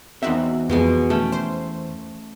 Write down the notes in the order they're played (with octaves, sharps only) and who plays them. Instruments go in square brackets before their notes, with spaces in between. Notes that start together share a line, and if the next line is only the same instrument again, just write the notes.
[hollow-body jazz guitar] E2 E5 [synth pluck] C4 D#4 F#4
[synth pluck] F2 [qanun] B2 G#3 G#5
[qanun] A3 C#4 G5
[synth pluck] C5